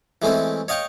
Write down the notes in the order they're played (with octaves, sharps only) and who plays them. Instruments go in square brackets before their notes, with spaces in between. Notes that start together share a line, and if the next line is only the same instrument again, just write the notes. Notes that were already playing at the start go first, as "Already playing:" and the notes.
[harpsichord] E3 G#3 A3 C4 C#4
C#5 D#5 F5 G5 C#6